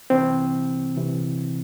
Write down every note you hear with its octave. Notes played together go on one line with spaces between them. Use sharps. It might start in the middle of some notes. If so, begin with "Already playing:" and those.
C2 C3 E3 C4
C3 E3